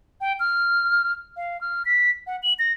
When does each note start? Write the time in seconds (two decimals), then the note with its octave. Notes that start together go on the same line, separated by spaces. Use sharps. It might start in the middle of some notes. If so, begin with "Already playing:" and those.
0.21 G5
0.40 F6
1.37 F5
1.61 F6
1.86 B6
2.27 F#5
2.43 F#7
2.59 A#6